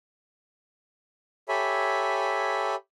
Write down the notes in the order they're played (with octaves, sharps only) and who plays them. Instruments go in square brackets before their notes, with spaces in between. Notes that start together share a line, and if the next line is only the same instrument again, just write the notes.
[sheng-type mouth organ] G4 A4 C#5 E5 G#5 B5